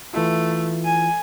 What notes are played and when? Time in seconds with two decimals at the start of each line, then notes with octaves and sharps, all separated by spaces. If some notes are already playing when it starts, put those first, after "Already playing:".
0.14 E3 A3 E4 F4
0.85 G#5